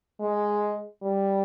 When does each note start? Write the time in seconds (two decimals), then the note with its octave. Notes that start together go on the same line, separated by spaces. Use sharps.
0.20 G#3
1.03 G3